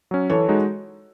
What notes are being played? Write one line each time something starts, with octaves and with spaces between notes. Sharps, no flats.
F#3 C#4
E3 A4 C#5
G#3 D#4 F#4